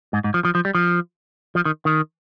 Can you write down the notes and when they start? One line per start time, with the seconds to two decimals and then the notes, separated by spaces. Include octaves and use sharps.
0.13 G#2
0.24 G#2
0.34 F3
0.45 F3
0.55 F3
0.65 G3
0.75 F3
1.55 F3
1.65 D#3
1.85 D#3